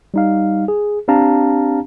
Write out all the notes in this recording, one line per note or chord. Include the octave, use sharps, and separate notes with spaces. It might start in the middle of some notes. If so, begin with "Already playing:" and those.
G3 D#4 F5
G#4
C4 D4 G4 F5 A5 A#5